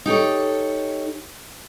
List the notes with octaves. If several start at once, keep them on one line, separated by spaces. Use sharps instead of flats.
D#4 G4 A4 C#5